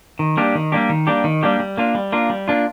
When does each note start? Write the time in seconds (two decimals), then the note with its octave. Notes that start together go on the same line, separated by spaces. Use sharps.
0.19 D#3
0.37 G3 A#3 D4 G4
0.55 D#3
0.72 G3 A#3 D4 G4
0.89 D#3
1.07 G3 A#3 D4 G4
1.24 D#3
1.43 G3 A#3 D4 G4
1.60 G3
1.77 A#3 D4 F4
1.95 G3
2.12 A#3 D4 F4
2.30 G3
2.48 A#3 D4 F4